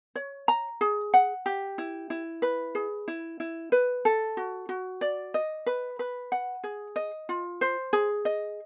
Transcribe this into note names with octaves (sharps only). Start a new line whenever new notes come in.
C#5
A#5
G#4
F#5
G4
E4
E4
B4
G#4
E4
E4
B4
A4
F#4
F#4
D5
D#5
B4
B4
F#5
G#4
D#5
F4
C5
G#4
D#5